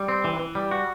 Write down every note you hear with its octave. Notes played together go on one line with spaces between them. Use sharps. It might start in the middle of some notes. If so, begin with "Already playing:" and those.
Already playing: G3
C4
E3
E3
G3
F#4